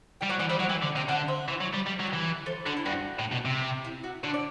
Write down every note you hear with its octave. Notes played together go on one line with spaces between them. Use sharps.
G3 G5
F#3 D5 F#5
E3 D5 F#5
G3 C5 E5
F#3 D5 F#5
E3 E5 G5
D3
C3 G5
D3 D5 F#5
C5 E5
E3
F#3
G3
G3
F#3
G4
E3
A4 C5
D3 F#4 A4
E4
G2 F#4
A2
B2
C3
E4
F#4
D3 F#4
D5